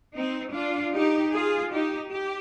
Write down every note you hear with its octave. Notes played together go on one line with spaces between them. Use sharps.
C4 D#4
D4 F4
D#4 G4
F4 G#4
D#4 G4
G4